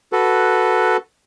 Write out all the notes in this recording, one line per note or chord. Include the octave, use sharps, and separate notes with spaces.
F#4 A4 B4